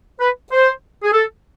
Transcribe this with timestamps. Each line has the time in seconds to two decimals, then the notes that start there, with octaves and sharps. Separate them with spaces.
0.20 B4
0.52 C5
1.03 G#4
1.13 A4